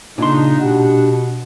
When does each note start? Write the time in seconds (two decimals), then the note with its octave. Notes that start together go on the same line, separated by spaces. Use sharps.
0.18 A#2 C#3 D4 D#4 C6
0.60 B2 G4 F#5